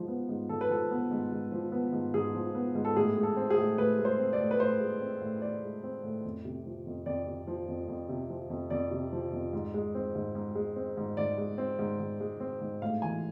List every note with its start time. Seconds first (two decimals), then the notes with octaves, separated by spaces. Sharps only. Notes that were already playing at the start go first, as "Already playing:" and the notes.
Already playing: G#2 F3
0.08 B3
0.29 G#2
0.49 G#2 A4
0.61 B4
0.69 F3 A4
0.91 B3
1.11 G#2
1.32 G#2
1.52 F3
1.72 B3
1.93 G#2
2.14 G#2 G#4
2.35 F3
2.55 B3
2.75 G#2
2.85 A4
2.96 A2 G#4
3.17 G#3
3.23 A4
3.37 C4
3.50 G#4
3.58 A2
3.78 A2 B4
3.99 G#3
4.05 C5
4.19 C4
4.33 D5
4.40 A2
4.51 B4
4.60 A2 C5
4.80 G#3
5.01 C4
5.21 A2
5.42 A2 D5
5.63 G#3
5.84 C4
6.03 A2
6.25 F2
6.45 C3
6.66 F3
6.87 F2
7.06 F2 D5
7.27 C3
7.47 F3
7.68 F2
7.89 F2
8.09 C3
8.30 F3
8.50 F2
8.70 F2 D5
8.91 C3
9.13 F3
9.33 F2
9.53 G#2
9.74 G#3
9.95 C4
10.15 G#2
10.35 G#2
10.55 G#3
10.76 C4
10.97 G#2
11.17 G#2 D5
11.38 G#3
11.58 C4
11.79 G#2
12.00 G#2
12.20 G#3
12.40 C4
12.61 G#2
12.82 A2 F5
13.02 E3 G#5